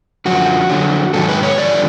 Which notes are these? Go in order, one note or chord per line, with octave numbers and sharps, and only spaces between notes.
F#2 D3 F3 F#4
F2 D3 F#3
G#2 D#3 F#3 A4
B4
C#5
G2 D3 F3 D5